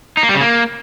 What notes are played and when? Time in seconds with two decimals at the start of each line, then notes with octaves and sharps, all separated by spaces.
0.17 D#4
0.23 A#3
0.29 G3
0.35 C#3
0.41 A#3